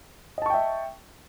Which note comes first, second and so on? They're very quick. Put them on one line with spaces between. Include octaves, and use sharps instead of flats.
D#5 A5 C#6 G5 E5